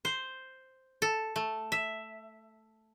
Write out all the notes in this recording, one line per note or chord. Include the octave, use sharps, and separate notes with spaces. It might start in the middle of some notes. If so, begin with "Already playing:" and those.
C5
A4
A3
E5